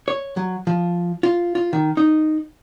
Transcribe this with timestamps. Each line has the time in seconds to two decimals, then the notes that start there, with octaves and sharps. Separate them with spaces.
0.08 C#5
0.37 F#3
0.67 F3
1.23 F4
1.55 F4
1.73 D#3
1.97 D#4